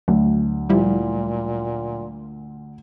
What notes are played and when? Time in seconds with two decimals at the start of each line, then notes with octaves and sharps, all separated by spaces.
0.08 D2 F#3
0.69 A#2 F3 G3 E4